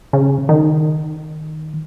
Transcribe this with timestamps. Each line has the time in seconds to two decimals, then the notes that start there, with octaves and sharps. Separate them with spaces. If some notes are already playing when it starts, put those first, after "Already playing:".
0.13 C#3
0.49 D#3